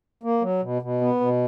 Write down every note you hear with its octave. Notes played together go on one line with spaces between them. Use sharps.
A#3
F#3
B2
B2
B3
B2